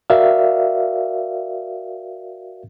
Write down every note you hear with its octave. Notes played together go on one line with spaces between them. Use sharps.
F#4 A#4 D5 E5 F5